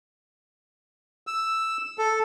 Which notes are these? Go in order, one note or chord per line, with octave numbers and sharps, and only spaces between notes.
E6
A4